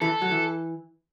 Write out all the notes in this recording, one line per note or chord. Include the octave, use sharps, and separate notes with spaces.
E3 A4
F#3
E3